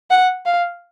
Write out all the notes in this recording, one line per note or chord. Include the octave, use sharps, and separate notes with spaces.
F#5
F5